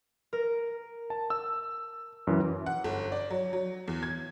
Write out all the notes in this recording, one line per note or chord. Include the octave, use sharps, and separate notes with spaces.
A#4
A5
E6
F#2 E3
F#5
G1
D5
F#3
F#3
E2
G#6